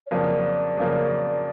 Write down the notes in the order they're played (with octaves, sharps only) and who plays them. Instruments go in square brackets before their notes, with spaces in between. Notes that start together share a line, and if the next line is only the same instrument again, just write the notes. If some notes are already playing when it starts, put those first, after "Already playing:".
[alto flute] C#5
[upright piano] F2 C#3 F#3 A#3 [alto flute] D5
[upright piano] F2 C#3 F#3 A#3